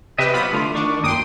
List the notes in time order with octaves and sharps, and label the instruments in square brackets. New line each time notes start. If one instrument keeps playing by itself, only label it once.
[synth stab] C3 G4 B4 [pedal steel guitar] D#5 E5
[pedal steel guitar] F#3 B3 F4 [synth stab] B5 D#6
[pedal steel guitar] D3 F4 [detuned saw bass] A3
[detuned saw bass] D#3 [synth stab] D4 [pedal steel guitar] C#6 D6
[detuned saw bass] F#2 [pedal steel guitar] A#3 G5 [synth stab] C6 D#6